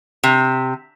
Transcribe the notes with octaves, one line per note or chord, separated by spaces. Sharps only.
C3